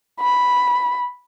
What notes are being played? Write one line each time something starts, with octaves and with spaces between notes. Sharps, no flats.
B5